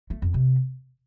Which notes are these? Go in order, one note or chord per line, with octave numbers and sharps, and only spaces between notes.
A3
F2
C3